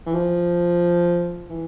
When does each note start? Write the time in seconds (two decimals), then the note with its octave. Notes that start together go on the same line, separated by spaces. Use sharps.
0.06 E3
0.14 F3
1.50 E3